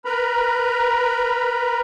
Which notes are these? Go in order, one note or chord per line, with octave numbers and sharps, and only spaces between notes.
A#4 B4 A#5 B5